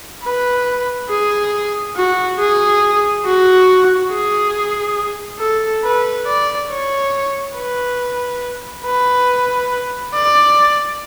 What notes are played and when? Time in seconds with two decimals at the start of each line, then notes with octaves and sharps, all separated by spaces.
0.24 B4
1.10 G#4
1.96 F#4
2.39 G#4
3.26 F#4
4.11 G#4
5.40 A4
5.84 B4
6.27 D5
6.69 C#5
7.56 B4
8.85 B4
10.14 D5